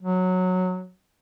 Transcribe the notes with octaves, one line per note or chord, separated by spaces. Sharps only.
F#3